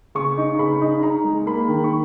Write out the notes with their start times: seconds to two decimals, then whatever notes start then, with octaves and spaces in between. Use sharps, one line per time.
0.15 C#3 C#6
0.37 D#4
0.59 C#3 B5
0.81 D#4
1.03 D#4 A#5
1.24 G#3
1.46 A#3 B5
1.68 D#3
1.84 C#6